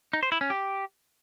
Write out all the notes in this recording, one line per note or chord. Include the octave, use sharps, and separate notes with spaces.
D#4
C5
E4
C#4
G4